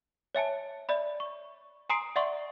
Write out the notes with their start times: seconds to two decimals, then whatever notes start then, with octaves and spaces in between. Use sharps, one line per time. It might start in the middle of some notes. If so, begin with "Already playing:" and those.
0.35 C#5 E5 G#5 A5
0.89 D5 E5 B5
1.20 C#6
1.90 G#5 A#5 C6 D#6 C7 D7
2.16 D5 E5 F#5 C6 C#6